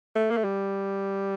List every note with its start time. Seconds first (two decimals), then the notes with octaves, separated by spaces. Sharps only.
0.15 A3
0.30 A#3
0.37 A3
0.44 G3